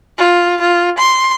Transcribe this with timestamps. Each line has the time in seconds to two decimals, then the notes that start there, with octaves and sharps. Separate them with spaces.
0.18 F4
0.61 F4
0.98 C6